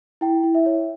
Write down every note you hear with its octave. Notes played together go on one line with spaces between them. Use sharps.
E4 G5
E4
E5
C#5